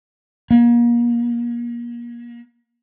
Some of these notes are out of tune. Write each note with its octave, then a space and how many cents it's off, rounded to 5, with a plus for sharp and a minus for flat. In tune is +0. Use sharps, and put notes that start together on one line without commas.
A#3 +35